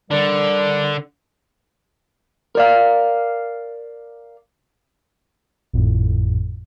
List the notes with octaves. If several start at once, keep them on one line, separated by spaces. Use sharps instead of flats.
D3 G3 A#4 D5
A#4 D5 F5
G#1 F2 A2